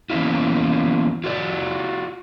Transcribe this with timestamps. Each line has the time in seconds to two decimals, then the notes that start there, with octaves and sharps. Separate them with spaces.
0.10 E3 A#3 B3 C#4 E4 F4
1.24 F4 F#4 C#5 D5